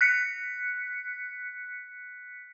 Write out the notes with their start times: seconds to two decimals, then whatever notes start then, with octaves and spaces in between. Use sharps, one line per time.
0.01 F#6 B6 C#7